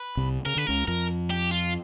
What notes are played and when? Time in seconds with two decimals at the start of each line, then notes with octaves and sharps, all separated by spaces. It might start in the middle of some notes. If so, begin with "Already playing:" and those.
Already playing: B4
0.17 C2 C3
0.45 C#3 A#4
0.57 D3 B4
0.67 C#2 C#3 A#4
0.87 F2 F3 A#4
1.30 G4
1.51 F4